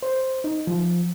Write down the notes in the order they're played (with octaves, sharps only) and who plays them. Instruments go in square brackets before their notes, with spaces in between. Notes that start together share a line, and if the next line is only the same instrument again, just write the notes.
[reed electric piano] C5
D#4
F3